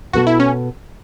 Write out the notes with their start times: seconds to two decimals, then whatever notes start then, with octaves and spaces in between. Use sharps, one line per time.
0.13 B2 B3 F#4 A4
0.27 E4
0.40 C#4